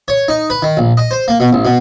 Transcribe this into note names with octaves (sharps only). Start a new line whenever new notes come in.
C#5
D#4
B4
D#3
A#1
D#5
C5
A#3
B2
A1
B2